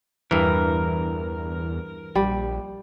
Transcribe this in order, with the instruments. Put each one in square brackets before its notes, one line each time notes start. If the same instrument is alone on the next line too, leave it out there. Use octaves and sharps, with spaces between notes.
[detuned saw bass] E2 [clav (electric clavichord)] G2 E3 [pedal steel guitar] A#4
[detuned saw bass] A#1 [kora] G3